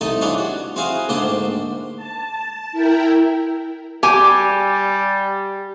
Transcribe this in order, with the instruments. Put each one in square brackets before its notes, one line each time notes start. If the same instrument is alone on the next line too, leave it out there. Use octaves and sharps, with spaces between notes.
[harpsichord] C2 A3 D#4 A4 D#6
E3 G3 D4 F4 G#4 C#5
F#4
C4 E4 F#4 G#4 F5 G#5
D2 G#2 A#3 D4 C5 G5
[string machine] A5
E4 A#4 G5
[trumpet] G3 [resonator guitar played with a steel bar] G4 G#5